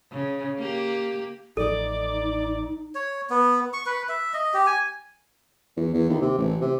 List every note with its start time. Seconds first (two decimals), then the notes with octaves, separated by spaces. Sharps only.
0.11 C#3
0.58 A#3 G4
1.57 A1 F3 D#4 A4 D5
2.95 C#5
3.30 B3
3.73 C#6
3.86 B4
4.09 E5
4.34 D#5
4.54 G4
4.67 G#5
5.76 E2
5.94 E2
6.09 D#2
6.21 C3
6.38 A1
6.61 C3